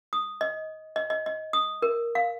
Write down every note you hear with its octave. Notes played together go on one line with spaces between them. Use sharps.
D#6
D#5
D#5
D#5
D#5
D#6
A#4
F5